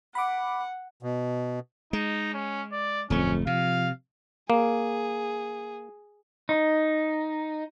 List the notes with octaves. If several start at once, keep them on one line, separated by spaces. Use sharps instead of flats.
F#5 B5 D6
B2
G#3 D#4
C#4
D5
D1 F2 A3 C#4
C3 F3 F5
A#3 G#4
D#4